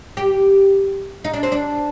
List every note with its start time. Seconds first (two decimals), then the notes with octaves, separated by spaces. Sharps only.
0.17 G4
1.24 D#4
1.33 D4
1.43 C4
1.52 D4